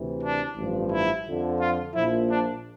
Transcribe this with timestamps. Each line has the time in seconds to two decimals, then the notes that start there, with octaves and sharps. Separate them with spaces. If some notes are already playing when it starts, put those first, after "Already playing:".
Already playing: D2 C3 E3
0.21 D4
0.56 A1 G2 F3
0.90 E4
1.25 F2 D3 F3
1.60 F4
1.94 A#1 A#2 F3 E4
2.29 D4